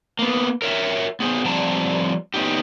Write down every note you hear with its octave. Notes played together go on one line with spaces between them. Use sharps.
A#3 B3
A#4 C#5 E5
B3 G#4 C5
F3 G3 C4 D5 A5 A#5
B3 C#4 D#4 G4